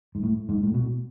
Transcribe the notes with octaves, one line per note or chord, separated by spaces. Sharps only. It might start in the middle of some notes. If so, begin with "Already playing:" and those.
G#2
A2
G#2
A2
B2